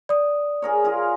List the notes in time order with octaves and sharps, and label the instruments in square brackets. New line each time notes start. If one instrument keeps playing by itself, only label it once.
[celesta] D5 D#6
[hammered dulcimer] G#4 A#4 C#5
F4 G#4 A#4